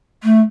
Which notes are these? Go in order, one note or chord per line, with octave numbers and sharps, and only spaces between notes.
A3